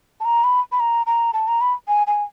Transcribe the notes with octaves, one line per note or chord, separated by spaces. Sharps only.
A5
A#5
B5
B5
A#5
A#5
A5
A#5
B5
G#5
G#5